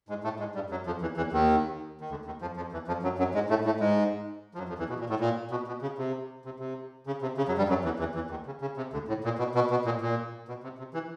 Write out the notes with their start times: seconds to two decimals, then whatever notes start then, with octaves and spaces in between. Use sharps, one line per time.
0.09 G#2 G#3
0.24 A2 A3
0.39 G#2 G#3
0.55 G2 G3
0.70 F#2 F#3
0.86 F2 F3
1.01 E2 E3
1.17 E2 E3
1.32 D#2 D#3
2.01 D#3
2.10 D2 D3
2.25 D#2 D#3
2.41 F2 F3
2.56 F2 F3
2.72 E2 E3
2.88 F2 F3
3.03 F#2 F#3
3.18 F#2 F#3
3.35 G#2 G#3
3.50 A2 A3
3.65 A2 A3
3.80 G#2 G#3
4.54 F3
4.58 F#2 F#3
4.69 F2 F3
4.79 E2 E3
4.89 B2
5.00 A#2
5.10 A2
5.20 A#2
5.51 B2
5.67 B2
5.82 C#3
5.98 C3
6.45 C3
6.60 C3
7.07 C#3
7.22 C3
7.37 C#3
7.48 F#2 F#3
7.58 G2 G3
7.69 F#2 F#3
7.84 E2 E3
7.99 E2 E3
8.15 E2 E3
8.30 D#2 D#3
8.46 C#3
8.61 C#3
8.77 C3
8.93 D2 D3
9.08 A2
9.24 A#2
9.39 B2
9.55 B2
9.71 B2
9.85 A#2
10.01 A#2
10.48 B2
10.63 C3
10.78 C3
10.94 E3